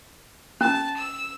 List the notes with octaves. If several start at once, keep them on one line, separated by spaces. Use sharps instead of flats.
C#4 A5
E6